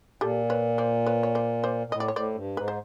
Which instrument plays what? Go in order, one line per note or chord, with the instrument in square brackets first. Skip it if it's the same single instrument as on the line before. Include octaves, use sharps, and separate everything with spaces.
[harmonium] A#2 [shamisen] G4 A4
[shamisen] B4 C#5
C5 D5
B4 C#5
C#5
C5 D5
C5 D5
[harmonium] A#2
[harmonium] A2 [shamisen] D#5
[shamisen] D5
C#5
[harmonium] A2 [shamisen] C5 D5
[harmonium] G2
[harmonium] G#2 [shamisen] B4
[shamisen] C5